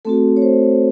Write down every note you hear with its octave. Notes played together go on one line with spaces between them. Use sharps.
A3 C4 F#4 A4
C#5
C5